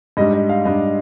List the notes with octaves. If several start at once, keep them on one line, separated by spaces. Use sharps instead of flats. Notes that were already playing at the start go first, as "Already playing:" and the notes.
G#2 G3 D4 D#5
D#5
F5
G#2 G3 D4 D#5